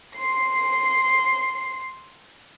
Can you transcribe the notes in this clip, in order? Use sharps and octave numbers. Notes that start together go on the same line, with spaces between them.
C6 C7